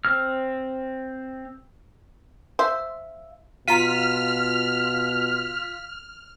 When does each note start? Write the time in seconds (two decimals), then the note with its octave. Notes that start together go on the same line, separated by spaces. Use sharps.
0.05 C4 F6
2.59 C5 E5 F5
3.68 B2 F4 A#5 F6 B6 D#7